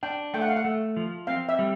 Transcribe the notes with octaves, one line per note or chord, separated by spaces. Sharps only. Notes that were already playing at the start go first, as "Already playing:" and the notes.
D4 G5
A3 G5
F#5
F5
F#5
A3
F3
C4 F5
E5
G3